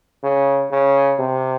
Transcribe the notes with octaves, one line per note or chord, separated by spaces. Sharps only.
C#3
C#3
C3